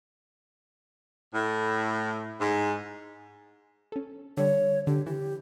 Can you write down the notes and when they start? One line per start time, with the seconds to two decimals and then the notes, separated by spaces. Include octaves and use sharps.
1.34 A2
2.41 G#2
3.92 C#4 A4
4.37 D3 G3 C#5
4.87 D3 G4
5.07 E3 G4